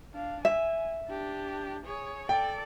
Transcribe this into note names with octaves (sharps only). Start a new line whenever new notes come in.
D4 F5
E5 G#5
D4 G4
G#4 C#5
A4 D5 G5